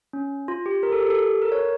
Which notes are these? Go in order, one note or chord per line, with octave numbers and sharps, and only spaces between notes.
C#4
F4
G4
A#4
A4
G4
A4
A#4
C#5